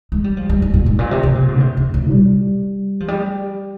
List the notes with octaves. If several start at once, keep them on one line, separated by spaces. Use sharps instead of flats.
G#3
G3
F3
G3
G3
A#2
G#2
A#2
C3
C3
A#2
G#2
D3
C3
C3
A#2
G3
F3
G3